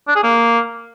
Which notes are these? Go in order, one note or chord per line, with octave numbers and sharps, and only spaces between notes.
D4
G#4
A#3